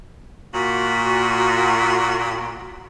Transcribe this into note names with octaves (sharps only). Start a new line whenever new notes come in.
A#2 F#4